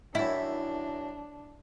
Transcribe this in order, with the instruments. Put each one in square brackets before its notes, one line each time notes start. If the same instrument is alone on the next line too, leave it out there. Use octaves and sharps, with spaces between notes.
[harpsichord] F#2 D#3 [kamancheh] D4 [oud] E4